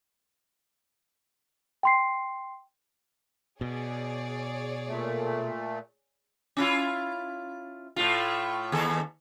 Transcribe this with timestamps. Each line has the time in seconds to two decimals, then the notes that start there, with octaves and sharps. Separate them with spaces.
1.83 G5 C6 C7
3.61 B2 G#4 C#5 D5
4.88 A#2 A3
6.57 C#4 E4 F4
7.96 A2 A3 F4
8.72 D#2 A4